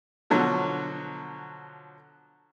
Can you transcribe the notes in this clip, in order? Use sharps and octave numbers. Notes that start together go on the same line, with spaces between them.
B2 D3 F3 F#3